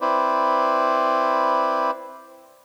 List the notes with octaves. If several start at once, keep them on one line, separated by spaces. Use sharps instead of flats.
C4 E4 B4 C5 D5